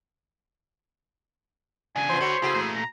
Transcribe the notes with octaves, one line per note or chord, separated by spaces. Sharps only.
C#3 D4 G#5
E3 F3 B3 C5
D3 A3 F#4 G#4 B4 C#5
C#3 E4 F#4 G#4 A4
A#2 A3
A#5